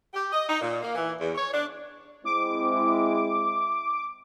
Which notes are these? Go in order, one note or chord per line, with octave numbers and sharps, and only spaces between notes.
G4
D#5
D#4
A#2
A#3
E3
E2
C#5
D4
G#3 C4 E4 D6